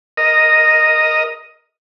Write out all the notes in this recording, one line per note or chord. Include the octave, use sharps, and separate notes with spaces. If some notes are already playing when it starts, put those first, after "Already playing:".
A#4 D#5